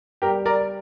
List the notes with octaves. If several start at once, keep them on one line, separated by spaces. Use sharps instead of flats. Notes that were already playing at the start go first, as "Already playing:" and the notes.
G3 G4 A#4
A#4 D5